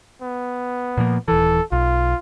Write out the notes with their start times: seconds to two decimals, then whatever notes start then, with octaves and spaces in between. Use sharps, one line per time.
0.22 B3
0.97 A#2 F3 A#3
1.28 D#1 E3 A4
1.72 B1 F4